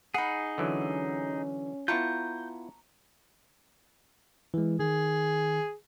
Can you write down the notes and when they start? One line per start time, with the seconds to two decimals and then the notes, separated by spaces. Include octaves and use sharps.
0.14 D#4 G#4 F#5 B5
0.58 D3 E3 F#3 C#4
1.88 B3 E4 F4 A5 A#5 C#6 G6
4.54 E3 G#3
4.79 D#3 G#4